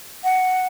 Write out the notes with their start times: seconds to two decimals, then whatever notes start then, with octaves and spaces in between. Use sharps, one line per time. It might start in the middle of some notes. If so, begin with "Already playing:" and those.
0.24 F#5